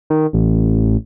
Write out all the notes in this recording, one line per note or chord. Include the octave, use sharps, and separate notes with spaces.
D#3
A1